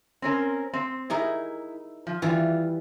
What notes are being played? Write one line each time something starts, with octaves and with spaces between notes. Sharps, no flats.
C4 C#4 A#4
C4
D#4 E4 G#4 A#4
F3
E3 G3 F4